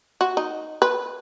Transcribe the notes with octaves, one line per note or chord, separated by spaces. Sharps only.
F#4
D#4
B4